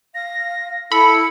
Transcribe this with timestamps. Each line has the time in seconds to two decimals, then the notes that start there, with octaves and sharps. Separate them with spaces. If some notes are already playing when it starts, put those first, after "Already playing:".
0.15 F5 A#6
0.92 E4 A4 B5 C#7